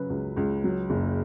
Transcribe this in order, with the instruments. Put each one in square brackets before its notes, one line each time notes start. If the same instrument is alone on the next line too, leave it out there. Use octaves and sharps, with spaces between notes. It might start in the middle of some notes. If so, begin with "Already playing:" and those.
Already playing: [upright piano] C#3 F#3 B4
C#2
C#2
F#3
F#1